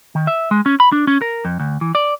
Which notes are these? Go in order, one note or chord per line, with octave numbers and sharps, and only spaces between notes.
D#3
E5
G#3
C#4
B5
D4
C#4
A#4
F2
D2
E3
D5